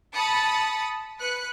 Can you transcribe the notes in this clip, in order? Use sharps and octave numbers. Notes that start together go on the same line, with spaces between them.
A5 B5 D#6 A6 C#7
B4 F#6 C#7